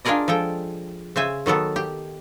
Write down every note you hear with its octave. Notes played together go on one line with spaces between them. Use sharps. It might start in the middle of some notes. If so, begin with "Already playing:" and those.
D4 F4 G#4 A#4 D5 D#5
F3 G#3 A4 G5
C#3 C5 E5 G#5
D#3 F#3 B3 A4
G4